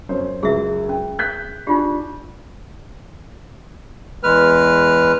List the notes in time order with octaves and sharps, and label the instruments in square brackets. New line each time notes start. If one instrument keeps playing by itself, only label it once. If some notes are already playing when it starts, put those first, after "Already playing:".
[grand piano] F#2 C#4 C5
[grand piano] C#2 F#2 [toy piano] G#4 E5
[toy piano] C#4
[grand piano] F#6 G6 B6
[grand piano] D4 [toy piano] D#4 F4 G4
[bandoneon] E2 G#3 B4 F6